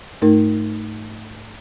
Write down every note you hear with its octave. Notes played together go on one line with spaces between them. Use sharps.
G#2 A3 D#4 A#4